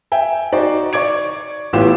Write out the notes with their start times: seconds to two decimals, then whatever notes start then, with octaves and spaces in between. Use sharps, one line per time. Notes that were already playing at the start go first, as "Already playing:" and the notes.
0.12 E5 G5 G#5
0.52 D#4 F#4 C5 D5
0.93 D5 C#6 D6 G#6 D7
1.73 A1 A2 B3 F4 G4 E7